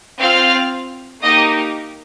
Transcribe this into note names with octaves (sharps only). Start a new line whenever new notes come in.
C4 F4 F5 F6
A#3 D#4 G4 D#5 D#6